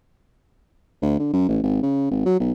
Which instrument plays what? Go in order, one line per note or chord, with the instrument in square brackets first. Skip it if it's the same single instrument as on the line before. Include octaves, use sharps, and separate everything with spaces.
[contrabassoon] D2
D3
F#2
A1
G#1
C#3
G#1
F#3
B1